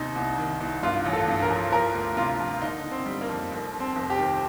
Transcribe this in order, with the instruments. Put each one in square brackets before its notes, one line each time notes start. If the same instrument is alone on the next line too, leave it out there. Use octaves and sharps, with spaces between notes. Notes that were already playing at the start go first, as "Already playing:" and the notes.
Already playing: [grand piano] D#2 C3 D#4
C2
D#3
C2
G2 F4
A1
A4
G2
A#4
F3
F3 A#4
D2
C3 F4
F3
D3 D#4
D3
C4
G3
A#3
F2
F1
F1
C4
F1
G4
D#3